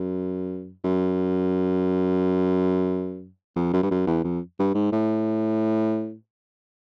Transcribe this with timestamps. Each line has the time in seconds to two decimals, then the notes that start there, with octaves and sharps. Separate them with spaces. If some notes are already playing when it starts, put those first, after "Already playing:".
Already playing: F#2
0.84 F#2
3.56 F2
3.73 F#2
3.83 G2
3.91 F#2
4.07 E2
4.24 F2
4.59 G2
4.75 G#2
4.92 A2